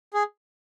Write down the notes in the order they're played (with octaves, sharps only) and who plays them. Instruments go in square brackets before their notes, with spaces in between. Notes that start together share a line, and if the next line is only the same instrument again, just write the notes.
[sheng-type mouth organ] G#4